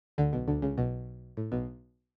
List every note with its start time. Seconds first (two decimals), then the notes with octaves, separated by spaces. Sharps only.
0.18 D2 D3
0.33 B1 B2
0.48 D2 D3
0.62 C#2 C#3
0.77 B1 B2
1.37 A2
1.52 B1 B2